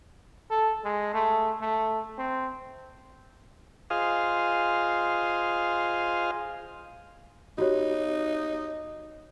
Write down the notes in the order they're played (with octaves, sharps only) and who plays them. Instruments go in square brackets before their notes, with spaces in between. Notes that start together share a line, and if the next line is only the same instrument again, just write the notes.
[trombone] A4
G#3
A3
A3
C4
[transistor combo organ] F4 G#4 C5 D#5 F5
[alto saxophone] D#4 [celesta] F#4 G4 C#5